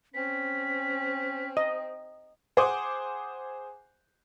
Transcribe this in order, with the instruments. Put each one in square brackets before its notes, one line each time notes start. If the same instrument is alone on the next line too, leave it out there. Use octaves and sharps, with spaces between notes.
[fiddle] C4 [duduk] C#4 [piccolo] B6
[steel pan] D#5
[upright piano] G#4 C5 F#5 G#5 D6 D#6